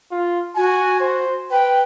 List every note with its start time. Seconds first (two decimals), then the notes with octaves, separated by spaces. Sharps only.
0.12 F4
0.56 F#4 G#5
1.00 C5
1.52 B4 G5